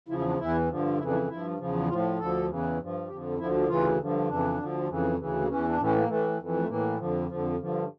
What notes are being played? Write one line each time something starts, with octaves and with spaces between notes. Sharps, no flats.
E2 C#3 F3 E4
E4
D4
E2 E3 E4
G2 D3 F3
F2 C#3 E3 E4
D4
E4
G2 F3 E4
E2 C#3 F3
A2 F3 F4
D2 D3 F3 A4
E2 C#3 E3
G2 F3
F2 D3 F3 G4
D2 D3 F3 E4
D2 C#3 E3 F4
G2 D3 F3
F2 C#3 E3 D4
D2 D3 F3
F2 C#3 E3
D2 C#3 E3
A#3
E2 E3 C#4
D4
A2 E3 C#4
A#3
A2 E3 A3
F2 E3
A3
A2 E3 A#3
F2 D3 F3
F2 D3 F3
G2 D3 F3